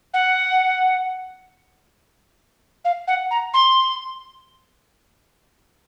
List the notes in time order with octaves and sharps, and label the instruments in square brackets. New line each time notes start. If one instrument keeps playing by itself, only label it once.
[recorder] F#5
F5
F#5
A#5
C6